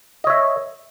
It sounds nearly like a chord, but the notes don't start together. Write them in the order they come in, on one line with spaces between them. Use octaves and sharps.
D#5 C#5 E5